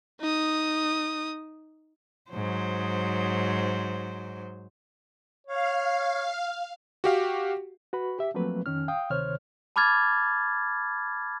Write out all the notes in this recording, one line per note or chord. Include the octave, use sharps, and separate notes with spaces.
D#4 D#6
G#2 F#3 C5
C#5 F5
F#4 G4 F5
F#4 B4 B5
G4 E5
F3 F#3 A3 A#3 C4 B4
F2 D#3 C#4 F6
F5 G5 D#6
D2 C3 D#3 C5 C#5 F6
A5 B5 D6 F6 G#6 A6